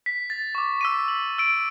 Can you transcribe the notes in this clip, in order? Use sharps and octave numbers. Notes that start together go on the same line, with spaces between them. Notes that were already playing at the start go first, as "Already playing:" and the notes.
B6
A6
C#6 D6
E6 B6 D#7
F#7
E6 D7